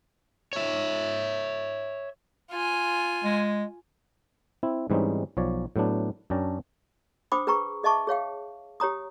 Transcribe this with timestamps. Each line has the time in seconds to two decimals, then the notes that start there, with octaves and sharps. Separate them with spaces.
0.53 C#5 E5
2.51 F4 G#5
3.24 G#3
4.63 C4 E4
4.90 G#2 E3 G3 C4 C#4 D#4
5.37 B1 F3 C#5 D5
5.76 A2 F#3 B3 D4
6.30 F#2 C#4 D4 G5 A5 A#5
7.32 D4 C5 G5 B5 D6 D#6
7.47 G#4 B4 G5 A#5 C#6
7.84 G#4 D#5 E5 A5 C#6 D6
8.07 G#4 C#5 F5 G5
8.80 G4 C#5 A#5 D#6